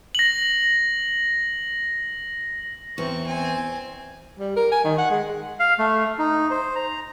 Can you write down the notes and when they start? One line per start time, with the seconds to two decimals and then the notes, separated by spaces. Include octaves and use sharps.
0.15 A#6 F#7
2.98 E2 C4 C#6
3.27 C4 G#5
4.39 G3
4.56 A#4
4.72 G#5
4.84 D#3
4.98 F#5
5.10 G#3
5.60 F5
5.79 A3
6.18 D#4
6.50 C5
6.75 A#5